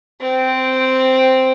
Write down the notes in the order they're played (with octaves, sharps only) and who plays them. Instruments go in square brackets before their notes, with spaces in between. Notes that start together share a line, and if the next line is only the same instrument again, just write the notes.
[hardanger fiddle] C4